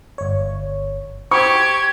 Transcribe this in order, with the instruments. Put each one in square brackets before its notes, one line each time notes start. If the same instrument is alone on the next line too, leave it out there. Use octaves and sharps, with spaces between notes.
[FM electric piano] G1 C#5
[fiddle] G4 [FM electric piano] C5 [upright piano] C#6 [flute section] G#6